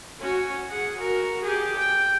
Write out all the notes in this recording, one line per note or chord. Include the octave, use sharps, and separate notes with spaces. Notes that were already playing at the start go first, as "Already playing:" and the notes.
C#4 F#4
G#4 F#5
F#4 A#4
G4 G#4
G5